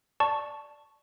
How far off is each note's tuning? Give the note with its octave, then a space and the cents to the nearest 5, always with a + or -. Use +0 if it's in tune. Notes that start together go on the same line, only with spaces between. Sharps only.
D5 +0 A5 +0 C#6 +0